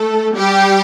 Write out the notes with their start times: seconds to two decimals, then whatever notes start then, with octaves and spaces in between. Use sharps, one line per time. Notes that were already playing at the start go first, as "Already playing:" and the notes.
Already playing: A3 A4
0.35 G3 G4